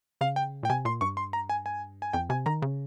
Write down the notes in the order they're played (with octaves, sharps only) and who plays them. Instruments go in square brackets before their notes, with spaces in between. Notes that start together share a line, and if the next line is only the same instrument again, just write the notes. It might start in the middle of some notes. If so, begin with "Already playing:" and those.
[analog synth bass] C#3 [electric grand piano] F5
[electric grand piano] G5
[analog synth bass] A#2 [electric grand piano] G5
[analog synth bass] C3 [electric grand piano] G#5
[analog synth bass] A#2 [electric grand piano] C6
[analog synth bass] G2 [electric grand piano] C#6
[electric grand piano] C6
A#5
G#5
G#5
G#5
[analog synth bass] F2 [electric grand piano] G5
[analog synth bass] C3 [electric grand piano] G#5
[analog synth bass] D#3 [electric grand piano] A#5
[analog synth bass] C#3